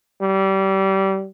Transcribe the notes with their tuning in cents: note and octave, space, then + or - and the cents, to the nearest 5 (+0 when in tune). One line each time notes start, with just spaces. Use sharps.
G3 -25